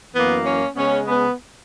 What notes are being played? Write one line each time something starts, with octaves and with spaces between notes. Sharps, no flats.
F#2 E3 A#3 B3
C#4
C#3 G#3 B3 C#4
B3